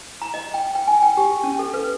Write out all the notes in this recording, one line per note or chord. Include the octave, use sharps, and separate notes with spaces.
A#5
D#5
G5
G5
G#5
G5
G4
C#4
A4
B4